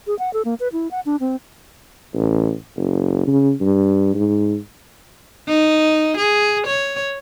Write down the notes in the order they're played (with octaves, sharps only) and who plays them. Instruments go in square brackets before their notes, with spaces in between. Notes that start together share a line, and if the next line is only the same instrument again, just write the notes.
[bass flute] G#4
F#5
A4
A#3
B4
E4
F#5
D4
C4
[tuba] A1
F#1
C#3
G2
G#2
[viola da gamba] D#4
G#4
C#5